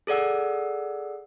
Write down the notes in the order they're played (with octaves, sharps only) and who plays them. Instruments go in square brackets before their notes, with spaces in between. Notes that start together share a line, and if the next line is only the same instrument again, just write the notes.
[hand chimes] G#4 A4 D5 F#5 E6